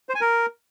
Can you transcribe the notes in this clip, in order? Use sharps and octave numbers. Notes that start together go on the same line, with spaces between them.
C5
G#5
A#4